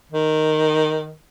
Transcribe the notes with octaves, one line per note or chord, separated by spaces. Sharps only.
D#3